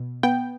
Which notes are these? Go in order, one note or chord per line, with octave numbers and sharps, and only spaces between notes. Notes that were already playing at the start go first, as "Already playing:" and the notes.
Already playing: B2
B3 G5